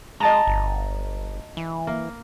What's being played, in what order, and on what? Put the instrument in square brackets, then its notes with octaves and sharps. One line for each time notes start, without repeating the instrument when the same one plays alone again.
[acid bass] G#3 [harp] D#5 A5 A#5
[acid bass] G1
E3
[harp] A#3